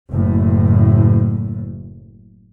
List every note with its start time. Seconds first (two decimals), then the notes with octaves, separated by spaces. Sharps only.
0.10 F#1 A2